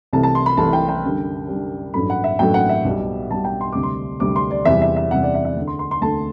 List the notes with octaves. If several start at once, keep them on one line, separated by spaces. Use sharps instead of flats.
C2 C3 E3 A3 A5
A5
C6
B5
C2 C3 E3 A3 A5
G5
G5
F#2 D3 G3
F#2 D3 G3
A1 G2 F#3 A3 B5
F#5
E5
A1 G2 F#3 A3 G5
F#5
E5
B1 B2 G3
B1 B2 G3 A5
G5
C6
D2 C3 G3 D6
C6
D2 C3 G3 D6
C6
D5
E2 C3 G3 E5
E5
E5
E2 C3 G3 F#5
D5
E5
E5
D2 D3 A3
C6
C6
C6
D2 D3 A3 A5